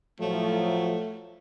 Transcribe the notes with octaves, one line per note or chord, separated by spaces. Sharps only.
A2 F3 F#3 A3